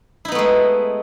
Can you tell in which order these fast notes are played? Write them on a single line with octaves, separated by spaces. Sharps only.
E4 D#4 B3 A3 G#3